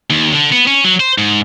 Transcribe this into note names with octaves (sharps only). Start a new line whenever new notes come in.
D#2
D3
B3
C#4
F#3
C5
G#2